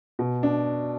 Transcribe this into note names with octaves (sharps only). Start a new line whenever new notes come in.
B2
D4